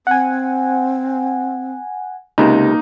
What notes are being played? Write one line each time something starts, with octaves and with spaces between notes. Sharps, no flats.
C4 F#5 G#5
C#2 C3 A#3 D#4 A#5